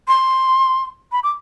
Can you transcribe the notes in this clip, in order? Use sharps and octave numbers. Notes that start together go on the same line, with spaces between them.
C6
B5
D6